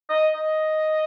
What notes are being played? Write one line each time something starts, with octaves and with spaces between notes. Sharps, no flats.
D#5
D#5